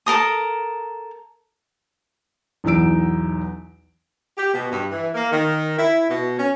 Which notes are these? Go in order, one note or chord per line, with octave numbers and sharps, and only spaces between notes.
A4 A#4 A#5 D#6
B1 E2 E3 D#4 E6 D7
G4
B2
G2
E3
A#3
D#3
E4
B2
C#4